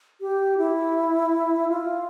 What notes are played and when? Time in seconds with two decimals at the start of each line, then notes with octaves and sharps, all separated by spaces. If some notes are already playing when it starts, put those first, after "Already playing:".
0.21 G4
0.58 E4
1.69 F4